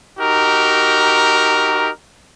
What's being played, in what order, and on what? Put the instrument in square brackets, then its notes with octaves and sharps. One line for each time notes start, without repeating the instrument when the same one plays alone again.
[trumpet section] D#4 F#4 G4 A#4